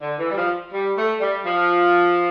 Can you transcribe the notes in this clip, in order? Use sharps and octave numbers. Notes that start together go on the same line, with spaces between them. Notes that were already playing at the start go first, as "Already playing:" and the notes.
D3
E3
G3
F3
G3
A3
G3
F3